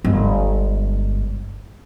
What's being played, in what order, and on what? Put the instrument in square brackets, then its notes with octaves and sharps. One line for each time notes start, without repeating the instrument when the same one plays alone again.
[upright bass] G1 G#3